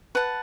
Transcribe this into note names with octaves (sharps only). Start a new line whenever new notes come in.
B4 F#5 A5